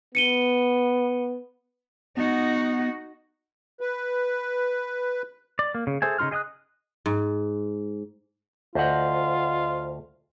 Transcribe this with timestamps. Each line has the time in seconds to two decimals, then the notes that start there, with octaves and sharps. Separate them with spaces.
0.15 B3 C#7 D#7 G7
2.17 B3 D#4 F#4
3.81 B4
5.59 D5
5.75 A#3
5.87 C#3
6.02 G#4 A4 C5 E5 G#5
6.18 C#3 D#4 F4 C6 F6
6.31 G#4 D#5 G5 D#6 F#6
7.06 G#2
8.75 D2 F4 C5 D#5 F#5